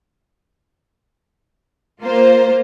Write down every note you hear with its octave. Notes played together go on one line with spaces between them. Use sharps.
A#3 F4 C5